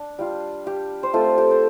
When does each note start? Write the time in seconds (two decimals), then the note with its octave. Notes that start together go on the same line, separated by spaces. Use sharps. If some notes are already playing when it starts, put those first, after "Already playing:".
Already playing: D4
0.19 G3 F4
0.67 G4
1.03 C5
1.13 A3 C4 F4 A4
1.38 G4
1.51 C5